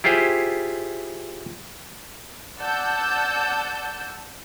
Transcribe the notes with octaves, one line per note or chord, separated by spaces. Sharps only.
E4 F4 G4 G#4 C5
D5 F#5 A5 E6 G6